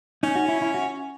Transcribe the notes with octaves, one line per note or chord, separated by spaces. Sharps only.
C#4 D#4
F#4
E4
E4
F#4